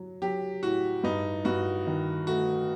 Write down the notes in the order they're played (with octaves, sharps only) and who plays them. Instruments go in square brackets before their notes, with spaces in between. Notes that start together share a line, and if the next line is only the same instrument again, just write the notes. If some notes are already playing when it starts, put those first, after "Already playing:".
Already playing: [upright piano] F#3
[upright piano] F#3 [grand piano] G4
[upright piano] A2 [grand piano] F#4
[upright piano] G2 [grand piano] D#4
[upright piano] G2 [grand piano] F#4
[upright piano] D#3
[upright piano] A3 [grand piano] F#4